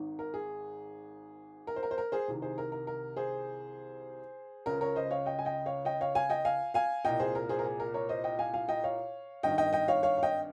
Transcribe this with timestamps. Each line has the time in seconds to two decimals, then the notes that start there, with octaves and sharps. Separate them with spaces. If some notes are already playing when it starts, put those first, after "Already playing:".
Already playing: G#1 G#2 D#3
0.19 A#4
0.34 G#4
1.67 A#4
1.76 C5
1.83 A#4
1.91 C5
1.98 A#4
2.12 G#4 C5
2.28 C2 C3 D#3
2.42 G#4 C5
2.58 A#4
2.72 A#4
2.87 A#4
3.16 G#4 C5
4.66 C#2 C#3 A#4
4.81 A#4 C#5
4.96 C5 D#5
5.11 C#5 F5
5.26 D#5 G5
5.39 G#5
5.45 D#5 G5
5.66 C#5 F5
5.85 D#5 G5
6.01 C#5 F5
6.15 F5 G#5
6.30 D#5 G5
6.45 F5 G#5
6.74 F5 G#5
7.05 C2 A#2 D#5 G5
7.20 G#4 C5
7.35 A#4
7.49 G#4 C5
7.59 A#4
7.65 G#4
7.80 A#4
7.94 A#4 C#5
8.09 C5 D#5
8.24 D#5 G5
8.39 F5 G#5
8.54 F5 G#5
8.69 D#5 G5
8.84 C#5 F5
9.43 G#1 G2 D#3 D#5 G5
9.58 D#5 G5
9.73 D#5 G5
9.88 C#5 F5
10.03 C#5 F5
10.18 F5
10.23 D#5 G5